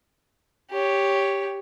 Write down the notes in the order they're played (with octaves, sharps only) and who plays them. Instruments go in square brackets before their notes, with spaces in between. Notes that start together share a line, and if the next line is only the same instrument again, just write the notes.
[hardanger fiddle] G4 C#5